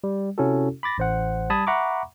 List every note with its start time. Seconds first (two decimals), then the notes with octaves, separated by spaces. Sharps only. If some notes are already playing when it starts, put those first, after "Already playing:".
0.04 G3
0.38 C3 C#4 E4 F#4 A4
0.83 B5 D6 A6 A#6
0.98 A1 C5 F#5
1.50 G3 A5 B5 D#6 G#6
1.67 E5 F#5 A#5 B5 C#6 D6